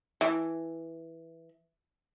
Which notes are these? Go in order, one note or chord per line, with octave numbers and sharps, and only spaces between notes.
E3